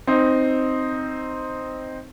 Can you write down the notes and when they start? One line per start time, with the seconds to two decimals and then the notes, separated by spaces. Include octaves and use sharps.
0.07 C4 D#4